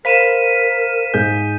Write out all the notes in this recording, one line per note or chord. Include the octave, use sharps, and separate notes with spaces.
A#4 C5 F5 B5 B6 D#7 E7
G#2 G#4 G6